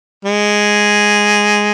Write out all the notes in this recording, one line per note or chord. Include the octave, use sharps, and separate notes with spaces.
G#3